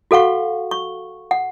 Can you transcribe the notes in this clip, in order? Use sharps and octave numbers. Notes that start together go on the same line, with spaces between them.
F#4 A4 F5 F#5 C#6
C#6
F#5